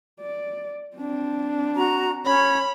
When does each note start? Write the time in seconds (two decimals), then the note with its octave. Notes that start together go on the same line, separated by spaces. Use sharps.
0.21 D5
0.97 C4 D4
1.76 F#4 A#5
2.26 C#4 C#5 B5